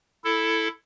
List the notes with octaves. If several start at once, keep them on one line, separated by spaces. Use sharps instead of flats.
E4 A4